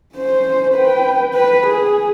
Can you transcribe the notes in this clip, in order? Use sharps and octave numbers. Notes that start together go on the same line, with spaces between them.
C#4 C5
B4 G5
B4
G#4